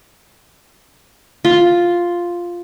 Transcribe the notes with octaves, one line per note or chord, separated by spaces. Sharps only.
F4